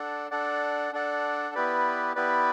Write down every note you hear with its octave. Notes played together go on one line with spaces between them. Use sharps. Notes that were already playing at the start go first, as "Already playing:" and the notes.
Already playing: D4 A4 D5 F#5
D4 A4 D5 F#5
D4 A4 D5 F#5
B3 E4 G4 B4 D5
B3 E4 G4 B4 D5